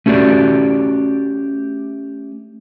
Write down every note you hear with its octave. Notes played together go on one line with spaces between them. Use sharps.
A3 C#4 F#4 G4 D5